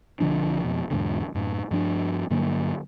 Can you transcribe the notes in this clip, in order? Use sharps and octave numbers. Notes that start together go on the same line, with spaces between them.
B1 D3 F3 D4
F2 B2
E2 G#2 B2 D3
F#2 A2
G2 F3 D4
G2 D3 F#3 A#3